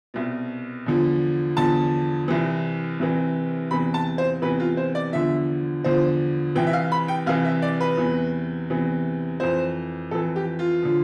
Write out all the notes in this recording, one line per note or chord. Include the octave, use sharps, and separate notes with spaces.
C2 B2
E2 D3 F3
E2 D3 F3 A5
C2 C3 E3
C2 C3 E3
E2 C3 E3 B5
A5
C5
E2 C3 E3 B4
F4
C5
D5
E2 D3 F3 E5
E2 D3 F3 C5
C2 C3 E3 G5
E5
F5
B5
G5
C2 C3 E3 F5
E5
D5
B4
E2 C3 E3
E2 C3 E3
F2 E3 C5
F2 E3 A4
G4
F4
D3 F3